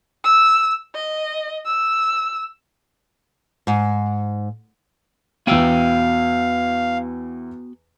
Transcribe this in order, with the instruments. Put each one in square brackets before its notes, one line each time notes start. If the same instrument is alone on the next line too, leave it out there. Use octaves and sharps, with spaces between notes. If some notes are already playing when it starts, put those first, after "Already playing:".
[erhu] E6
D#5
E6
[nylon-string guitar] G#2
[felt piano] E2 E6 D#7 [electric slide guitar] B3 F#4 G5 [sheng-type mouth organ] F5